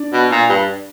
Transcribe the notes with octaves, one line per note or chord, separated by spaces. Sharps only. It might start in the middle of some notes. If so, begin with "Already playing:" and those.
Already playing: D4
B2
A#2
G2